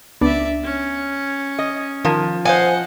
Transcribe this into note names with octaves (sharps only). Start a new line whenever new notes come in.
C#2 B3 D4 D5 E5
C#4
D#5
D#3 F3 A#4 G#6
C5 D#5 F5 F#5 G#5